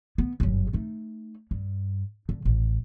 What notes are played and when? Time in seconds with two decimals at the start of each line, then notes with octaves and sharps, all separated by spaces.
0.18 B3
0.40 G1 F#2
0.73 A3 D#4
1.51 G2
2.29 D3
2.45 A1